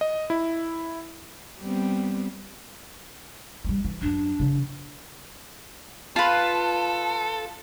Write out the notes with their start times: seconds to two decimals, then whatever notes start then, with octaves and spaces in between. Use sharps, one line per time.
0.01 D#5
0.30 E4
1.61 G3 B3 C4
3.65 F#3 G3
3.85 E3
4.02 F#2 F#3 D4
4.39 C#3 E3
6.16 F4 A4 B4